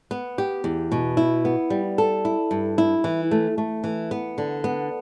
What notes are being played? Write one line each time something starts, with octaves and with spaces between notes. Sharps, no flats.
B3
G4
E2
B2
E4
B3
G3
A4
E4
G2
E4
E3
A3
A3
E3
B3
D3
B3